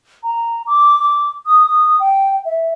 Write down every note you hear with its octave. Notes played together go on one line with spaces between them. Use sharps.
A#5
D6
D6
D#6
D#6
G5
E5